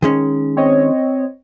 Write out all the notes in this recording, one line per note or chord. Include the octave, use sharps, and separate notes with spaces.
D#3 G#3 C#4
C4 C#5 D#5